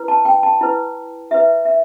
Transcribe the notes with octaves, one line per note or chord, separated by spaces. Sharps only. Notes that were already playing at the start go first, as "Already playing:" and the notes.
Already playing: E4 B4
A5
G5
A5
E4 B4
E4 B4 E5
E5